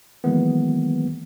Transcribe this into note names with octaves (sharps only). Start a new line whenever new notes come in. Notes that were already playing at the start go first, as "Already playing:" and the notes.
D#3 E3 F#3 G#3 A#3 B3